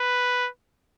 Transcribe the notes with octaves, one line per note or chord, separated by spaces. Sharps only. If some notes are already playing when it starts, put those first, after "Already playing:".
Already playing: B4